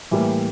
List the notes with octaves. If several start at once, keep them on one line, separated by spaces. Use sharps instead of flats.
A2 E3 G3 A#3